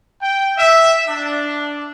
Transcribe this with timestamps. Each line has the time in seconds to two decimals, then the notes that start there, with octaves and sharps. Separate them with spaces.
0.22 G5
0.58 E5
1.07 D4